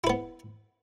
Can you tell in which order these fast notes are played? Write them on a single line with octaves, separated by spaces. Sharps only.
E4 B4 B3